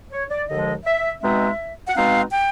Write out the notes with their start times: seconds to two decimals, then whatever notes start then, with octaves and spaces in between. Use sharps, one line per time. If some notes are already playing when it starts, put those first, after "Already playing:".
0.12 C#5
0.31 D5
0.49 D#2 D3 F3 G#3 D#5
0.85 E5
1.22 B2 G#3 C4 D#4 E5
1.89 F#5
1.96 B2 G#3 C4 D#4 F5
2.33 G5